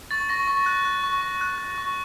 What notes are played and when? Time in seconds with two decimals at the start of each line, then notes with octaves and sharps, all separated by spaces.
0.11 C#6 A6
0.29 C#6 A#6
0.47 C#6
0.66 F#6
0.85 F#6
1.04 C#6
1.21 C#6
1.41 F#6
1.58 F#6
1.78 C#6